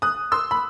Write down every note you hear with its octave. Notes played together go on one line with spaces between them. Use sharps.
D#6 F#6
C6 E6
B5